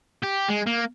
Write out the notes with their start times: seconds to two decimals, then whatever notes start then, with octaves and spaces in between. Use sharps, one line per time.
0.23 G4
0.49 G#3
0.66 A#3